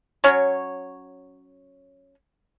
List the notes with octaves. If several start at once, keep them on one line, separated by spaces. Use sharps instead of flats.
F#3 C#4 C#5